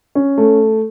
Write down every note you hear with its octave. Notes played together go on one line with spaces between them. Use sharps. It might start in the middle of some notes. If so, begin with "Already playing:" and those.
C#4
A3